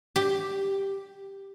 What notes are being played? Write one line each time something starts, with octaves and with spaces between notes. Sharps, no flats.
G4